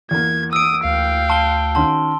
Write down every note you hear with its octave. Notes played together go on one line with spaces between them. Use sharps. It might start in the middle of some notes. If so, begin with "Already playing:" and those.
E2 A#3 G#6
D#6 E6 D7
D2 F5 G5
A5 C6 G7
D#3 C#4 F#4 A5 C6